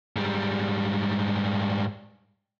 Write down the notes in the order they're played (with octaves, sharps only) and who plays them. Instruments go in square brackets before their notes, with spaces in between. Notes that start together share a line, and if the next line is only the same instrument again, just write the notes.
[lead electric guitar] G#2 G3